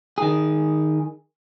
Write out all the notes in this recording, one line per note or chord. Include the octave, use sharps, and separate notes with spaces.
D#3 G#4